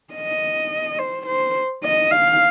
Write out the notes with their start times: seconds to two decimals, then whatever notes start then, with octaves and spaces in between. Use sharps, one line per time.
0.14 D#5
0.98 C5
1.26 C5
1.83 D#5
2.11 F5